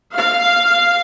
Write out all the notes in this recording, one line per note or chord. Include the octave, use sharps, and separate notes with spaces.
F5